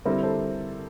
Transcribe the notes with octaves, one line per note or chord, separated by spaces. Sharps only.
D3 G3 C4 E4 A#4
A4 C5